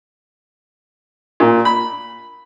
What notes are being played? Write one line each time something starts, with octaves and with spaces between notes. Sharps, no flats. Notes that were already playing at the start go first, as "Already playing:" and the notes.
A#2
B5